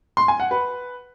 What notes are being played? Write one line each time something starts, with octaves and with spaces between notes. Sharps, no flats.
C6
G#5
F#5
B4